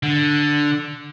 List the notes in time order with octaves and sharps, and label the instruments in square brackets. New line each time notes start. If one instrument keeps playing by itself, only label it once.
[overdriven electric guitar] D3